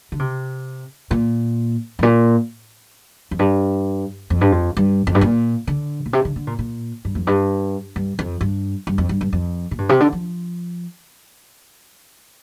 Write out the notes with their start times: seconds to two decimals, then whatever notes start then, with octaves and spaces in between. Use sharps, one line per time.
0.12 D3
0.19 C3
1.11 A#2
1.99 G2
2.03 A#2
3.31 F2
3.39 G2
4.30 F2
4.41 G2
4.52 F2
4.77 G2
5.07 F2
5.15 G2
5.21 A#2
5.67 D3
6.06 A#2
6.13 C3
6.25 D3
6.36 D3
6.47 A#2
6.59 A#2
7.05 G2
7.15 F2
7.27 G2
7.96 G2
8.19 F2
8.41 G2
8.87 G2
8.98 F2
9.09 G2
9.21 G2
9.33 F2
9.71 A#2
9.78 G2
9.89 C3
10.00 D3
10.13 F3